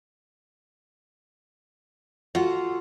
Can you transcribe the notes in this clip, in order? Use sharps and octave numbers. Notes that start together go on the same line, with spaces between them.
F4 F#4 A4 F#5